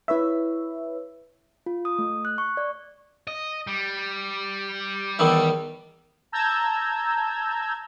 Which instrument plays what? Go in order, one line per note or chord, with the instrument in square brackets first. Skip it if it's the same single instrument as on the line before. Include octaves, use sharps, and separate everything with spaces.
[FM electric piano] E4 B4 C#5 E5
[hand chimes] F4
D#6
A3
F#6
C#6
D5
[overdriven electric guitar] D#5
G3
[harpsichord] E2 D#3 E3
[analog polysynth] A5 A#5 E6 G6 G#6